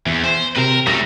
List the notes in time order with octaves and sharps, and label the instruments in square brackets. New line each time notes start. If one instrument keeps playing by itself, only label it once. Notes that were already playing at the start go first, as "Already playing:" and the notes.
[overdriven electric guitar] E2
C5
[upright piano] C3 [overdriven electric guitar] A#4 B4
[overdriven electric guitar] G3 A3 [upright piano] A#6